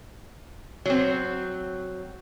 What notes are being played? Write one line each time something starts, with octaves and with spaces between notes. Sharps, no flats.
F#3 C4